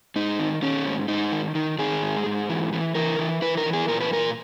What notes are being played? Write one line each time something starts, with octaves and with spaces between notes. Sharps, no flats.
G#2 D#4
D#3
D#3 C#4
G#2
G#2 D#4
D#3
D#3
D#3 G#4
G#2
G#2
E3
E3
E3 A#4
E3
E3 B4
A#4
E3
G#4
A#2 A#4
B4
A#2 A#4